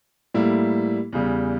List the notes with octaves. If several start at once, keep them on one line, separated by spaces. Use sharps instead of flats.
A2 G3 A#3 E4
E2 C#3 G3